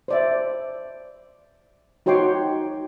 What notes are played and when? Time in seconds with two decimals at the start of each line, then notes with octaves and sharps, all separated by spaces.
0.08 C5 D5 E5
2.06 D#4 F#4 C#5 G5 C6 D6